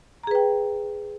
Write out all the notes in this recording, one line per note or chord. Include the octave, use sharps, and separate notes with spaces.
G#4 B4 G5 A#5